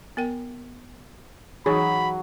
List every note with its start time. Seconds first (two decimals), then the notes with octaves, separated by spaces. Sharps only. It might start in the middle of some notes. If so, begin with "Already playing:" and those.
0.17 B3 A#4 G5
1.66 E3 F#3 D#4 G#4 C#5 B5